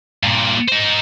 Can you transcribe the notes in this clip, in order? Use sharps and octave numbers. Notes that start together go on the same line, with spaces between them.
G2 A#2
D#4 C5